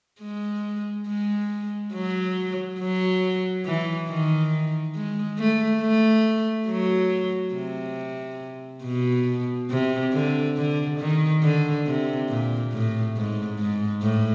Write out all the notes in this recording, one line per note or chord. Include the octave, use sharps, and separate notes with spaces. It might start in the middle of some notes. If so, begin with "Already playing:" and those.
G#3
G#3
F#3
F#3
E3
D#3
G#3
A3
A3
F#3
C3
B2
C3
D3
D3
D#3
D3
C3
A#2
A2
G#2
G#2
A2